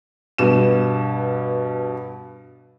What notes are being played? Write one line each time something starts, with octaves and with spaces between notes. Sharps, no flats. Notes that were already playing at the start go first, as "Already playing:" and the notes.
G2 B2 E7